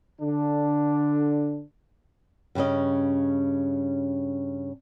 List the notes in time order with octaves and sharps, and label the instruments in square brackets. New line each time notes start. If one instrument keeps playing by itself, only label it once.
[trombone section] D3 D4
[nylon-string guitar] G2 C#3 F#3 C#4 D#5